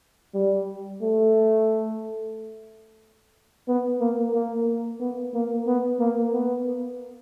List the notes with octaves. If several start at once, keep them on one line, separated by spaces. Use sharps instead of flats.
G3
A3
B3
A#3
A#3
B3
A#3
B3
A#3
B3